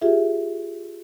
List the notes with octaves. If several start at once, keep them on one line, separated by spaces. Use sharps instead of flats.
F4 G4 G#4 E5